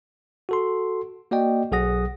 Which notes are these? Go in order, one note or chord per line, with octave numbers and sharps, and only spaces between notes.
F#4 A4 C6
A#3 F#4 D5 D#5 G5
B1 F#3 G#4 F#5 D#6 A#6